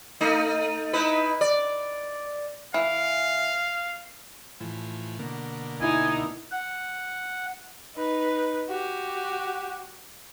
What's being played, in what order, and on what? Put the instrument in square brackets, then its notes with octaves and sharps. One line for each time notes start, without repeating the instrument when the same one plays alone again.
[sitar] A3 D#4
D#4 E4 B4
D5
[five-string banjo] E3 [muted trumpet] F5
[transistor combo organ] A2 E3 F3
B2 D3 A#3
[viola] D#4 [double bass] E4 [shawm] G#5
[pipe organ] F#5
[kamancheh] D#4 B4
F#4 G4